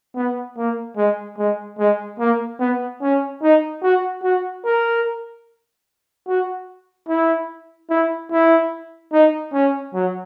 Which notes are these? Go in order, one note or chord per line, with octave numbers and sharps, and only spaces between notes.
B3
A#3
G#3
G#3
G#3
A#3
B3
C#4
D#4
F#4
F#4
A#4
F#4
E4
E4
E4
D#4
C#4
F#3